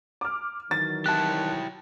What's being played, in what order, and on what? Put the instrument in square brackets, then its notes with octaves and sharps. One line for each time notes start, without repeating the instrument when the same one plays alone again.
[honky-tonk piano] D6 F6
[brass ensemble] D#3 E3 F#3 [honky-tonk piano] A6
[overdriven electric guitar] E4 G4 [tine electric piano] A5 F#6